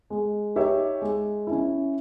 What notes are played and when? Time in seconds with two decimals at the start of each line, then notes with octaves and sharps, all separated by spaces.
0.10 G#3
0.56 D#4 G4 C#5 E5
1.02 G#3
1.47 C#4 E4